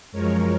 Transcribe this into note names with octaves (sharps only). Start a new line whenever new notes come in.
F#2 F3 G#3 A#4 C#5